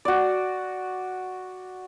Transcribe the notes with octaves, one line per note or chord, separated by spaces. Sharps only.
F#4 D5